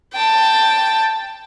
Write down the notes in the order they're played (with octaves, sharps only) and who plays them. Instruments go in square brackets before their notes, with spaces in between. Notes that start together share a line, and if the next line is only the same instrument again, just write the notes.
[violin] G5 A5